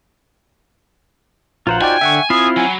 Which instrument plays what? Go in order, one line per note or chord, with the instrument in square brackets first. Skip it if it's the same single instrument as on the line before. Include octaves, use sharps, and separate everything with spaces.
[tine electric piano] A#1 F5 [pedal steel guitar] F4 C5 F#5 [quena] A#5
[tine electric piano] D#4 F#4 D5 [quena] G5 [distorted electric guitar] G#5
[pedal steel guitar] D3 [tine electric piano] E5 F#5 C#6
[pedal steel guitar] C4 E4 F4 [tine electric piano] B5 C7 [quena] D#6
[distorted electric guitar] F#3 [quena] G#5